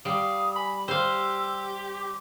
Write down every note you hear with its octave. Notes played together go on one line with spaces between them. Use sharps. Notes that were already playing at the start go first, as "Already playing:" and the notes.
G3 F5 D#6
G#5 B5
G4 C5 F5 E6
D6